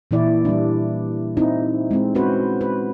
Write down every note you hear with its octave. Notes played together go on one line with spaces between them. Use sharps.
A#2 E3 E4 D5
G3 D4
C4 D#4 E4
G#3 C4
C4 C#4 F#4 B4 C5
B4